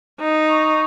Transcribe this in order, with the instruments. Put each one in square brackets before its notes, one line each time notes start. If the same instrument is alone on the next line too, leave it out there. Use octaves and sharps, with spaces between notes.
[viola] D#4
[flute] C#6